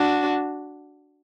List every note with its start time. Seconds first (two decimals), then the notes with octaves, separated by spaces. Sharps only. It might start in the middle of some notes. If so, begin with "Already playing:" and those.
Already playing: D4 F#4